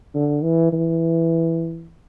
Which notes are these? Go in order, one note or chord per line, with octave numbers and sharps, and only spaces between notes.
D3
E3
E3